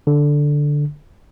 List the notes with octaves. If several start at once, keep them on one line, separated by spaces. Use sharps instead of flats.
D3